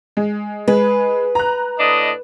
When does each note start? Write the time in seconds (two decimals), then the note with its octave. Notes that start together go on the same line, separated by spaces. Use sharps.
0.17 G#3
0.68 G#3 B4
1.35 A#5 F#6
1.79 A2 D4 D#5